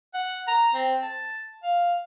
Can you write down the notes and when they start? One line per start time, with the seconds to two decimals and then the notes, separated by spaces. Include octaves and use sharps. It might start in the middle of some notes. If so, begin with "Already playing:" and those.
0.14 F#5
0.47 A#5
0.74 C4
1.02 A5
1.63 F5